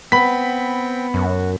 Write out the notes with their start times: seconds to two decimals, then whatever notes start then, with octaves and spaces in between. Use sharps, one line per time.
0.12 B3 C4 G5 B5 B6
1.14 F#2 F#4